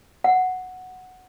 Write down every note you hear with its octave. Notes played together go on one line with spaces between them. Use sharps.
F#5